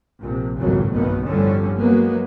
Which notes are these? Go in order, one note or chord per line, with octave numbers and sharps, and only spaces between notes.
A#1 C3
G#1 C#2 F#2 A2 C#3 F#3
F#1 B1 G2 B2 D#3 B3
G1 A2 D3 F3 G3 C#4
F#3 G#3 A#3 B3